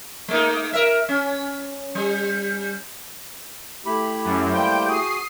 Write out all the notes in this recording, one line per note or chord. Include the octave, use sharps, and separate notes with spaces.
G#3 A#3 D#4
A#4 E5
C#4
G3
A3 E4 G4 B5
F#2
G3 A#3 C5 G5
F#4 G#4 D#6 C7